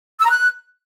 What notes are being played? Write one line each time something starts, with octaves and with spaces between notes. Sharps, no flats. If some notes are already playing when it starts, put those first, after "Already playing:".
E6
A#5
F#6